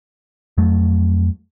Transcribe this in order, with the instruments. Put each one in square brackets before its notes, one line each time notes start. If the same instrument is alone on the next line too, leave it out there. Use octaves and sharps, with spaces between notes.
[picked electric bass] F2 F#3 A3